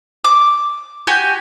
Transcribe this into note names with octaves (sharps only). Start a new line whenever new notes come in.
D6
F#4 G4 G5 G#5